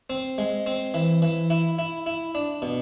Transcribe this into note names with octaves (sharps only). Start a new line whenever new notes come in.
C4
G#3
C4
E3
E3
E4
E4
E4
D4
B2